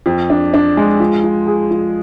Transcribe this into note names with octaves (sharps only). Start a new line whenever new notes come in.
F2
D4
D4
G#3
F3
F3
G#4
F3